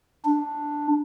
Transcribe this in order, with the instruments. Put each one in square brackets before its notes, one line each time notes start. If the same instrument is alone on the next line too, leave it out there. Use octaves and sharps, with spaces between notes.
[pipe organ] D4